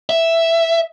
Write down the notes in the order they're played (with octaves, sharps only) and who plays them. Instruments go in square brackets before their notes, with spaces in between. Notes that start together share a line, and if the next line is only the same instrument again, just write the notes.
[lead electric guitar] E5